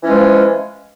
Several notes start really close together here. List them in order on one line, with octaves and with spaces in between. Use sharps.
E3 C#4 G#3 F3